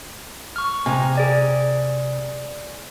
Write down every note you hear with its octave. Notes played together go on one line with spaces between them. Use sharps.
C#6 F6
C3 G#5 A#5
G#4 D5 G#5